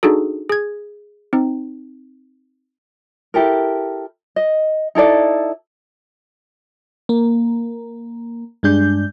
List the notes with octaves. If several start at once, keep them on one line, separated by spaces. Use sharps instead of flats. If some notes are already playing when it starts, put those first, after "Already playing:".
D4 D#4 F#4 G#4 A4
G#4 G#6
C4 D#4
E4 G4 A4 A#4
D#5
D#4 E4 A4 D5
A#3
G2 G#3 D4 G6